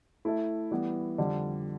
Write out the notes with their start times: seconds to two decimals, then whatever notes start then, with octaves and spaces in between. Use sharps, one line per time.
0.25 A3 E4 A4 E5
0.71 E3 G3 B3
1.18 F2 D3 G3